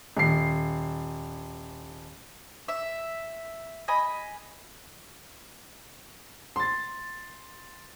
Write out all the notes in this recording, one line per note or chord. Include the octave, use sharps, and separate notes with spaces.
D#1 C7
E5
D#5 G#5 B5
C6 A6